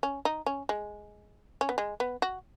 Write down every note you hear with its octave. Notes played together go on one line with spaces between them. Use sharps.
C#4
D#4
C#4
G#3
C#4
B3
G#3
B3
F#4